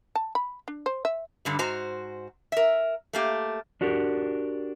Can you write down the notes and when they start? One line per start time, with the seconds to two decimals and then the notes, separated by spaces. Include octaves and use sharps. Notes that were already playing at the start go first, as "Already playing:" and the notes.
0.15 A5
0.35 B5
0.68 D4
0.86 C5
1.05 E5
1.45 G2 D3 G3
1.59 G#2 F#4 C5 A#5
2.52 A#4 E5
3.13 A3 A#3 G4
3.81 D4 F#4 G4 A#4